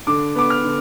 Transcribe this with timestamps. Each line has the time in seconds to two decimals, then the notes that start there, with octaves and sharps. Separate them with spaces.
0.07 D3 D6
0.35 B3 D6
0.50 F6
0.64 D3